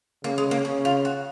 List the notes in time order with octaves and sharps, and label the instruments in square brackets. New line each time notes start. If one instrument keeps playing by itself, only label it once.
[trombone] C#3 [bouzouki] A#3
[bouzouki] G#3
A#3
[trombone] C#3 [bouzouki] C#4
[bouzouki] F4
F#4